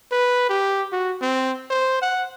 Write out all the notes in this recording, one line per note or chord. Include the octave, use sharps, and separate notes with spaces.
B4
G4
F#4
C4
C5
F#5